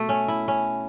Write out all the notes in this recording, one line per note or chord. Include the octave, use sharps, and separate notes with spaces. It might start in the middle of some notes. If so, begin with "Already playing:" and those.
Already playing: B2 A3
C#4
E4
C#4